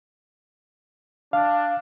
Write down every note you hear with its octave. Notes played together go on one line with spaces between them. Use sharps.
D4 F5